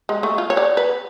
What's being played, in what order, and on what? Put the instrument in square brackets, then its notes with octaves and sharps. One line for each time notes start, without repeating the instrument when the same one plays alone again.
[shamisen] G#3
A3
F4
C#5
D5
B4